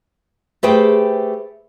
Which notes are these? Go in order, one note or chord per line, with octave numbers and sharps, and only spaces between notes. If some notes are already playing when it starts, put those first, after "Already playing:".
A3 G4 G#4 B4 C5 G5